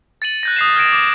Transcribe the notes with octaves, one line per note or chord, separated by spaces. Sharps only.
A6 C#7 D#7 F#7
F#6 G6 A#6
D#6 C7 E7
F6 G#6 A#6 D7 E7
D6